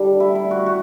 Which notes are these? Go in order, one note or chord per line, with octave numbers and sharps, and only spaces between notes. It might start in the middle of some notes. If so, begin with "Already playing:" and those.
Already playing: D3 G3
E4
E4
F#4
F#4